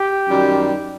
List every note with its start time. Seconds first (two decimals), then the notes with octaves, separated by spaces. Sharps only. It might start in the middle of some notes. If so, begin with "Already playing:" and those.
Already playing: G4
0.29 F#2 D#3 G3